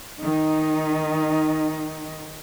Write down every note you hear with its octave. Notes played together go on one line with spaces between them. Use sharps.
D#3 D#4